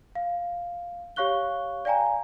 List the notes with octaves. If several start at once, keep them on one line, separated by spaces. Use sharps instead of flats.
F5
G4 C#5 F5 C#6 F#6 G7
D5 F5 G5 G#5 A#5